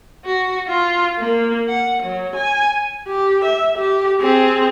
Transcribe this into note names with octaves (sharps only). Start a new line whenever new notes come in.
F#4
F4
A#3
F#5
F#3
G#5
G4
E5
G4
C4 G#4